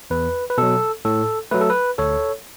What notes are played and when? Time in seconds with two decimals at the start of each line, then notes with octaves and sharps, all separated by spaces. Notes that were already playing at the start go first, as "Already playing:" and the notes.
0.10 E2 B4
0.50 B4
0.58 B2 F#3 A4
1.05 A2 A4
1.51 F#3 A3 B4
1.61 A4
1.70 B4
1.98 D2 A4 C#5